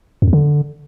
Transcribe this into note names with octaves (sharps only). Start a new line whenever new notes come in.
F#2
E2
D3